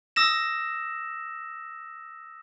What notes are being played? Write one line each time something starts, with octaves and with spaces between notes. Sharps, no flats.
D#6 E6 A#6 E7